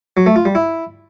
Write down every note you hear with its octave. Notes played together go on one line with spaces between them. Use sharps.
F#3
A3
F4
G3
E4